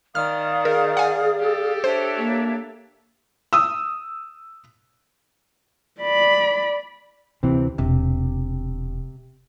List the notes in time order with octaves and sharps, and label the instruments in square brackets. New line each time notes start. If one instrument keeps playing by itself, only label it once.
[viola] D#3 [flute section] D5 F5 D#6 [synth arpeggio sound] F6
[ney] G#4 [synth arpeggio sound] A#4
[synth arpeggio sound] F#5 G#5
[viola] G4 A4
[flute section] D4 C#5 E5 [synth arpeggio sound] C5
[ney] A#3
[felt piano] D#6 E6
[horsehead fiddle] D5 B5
[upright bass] D2 [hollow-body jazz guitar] C3 E3 C4
[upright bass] E1 [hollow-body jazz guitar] C3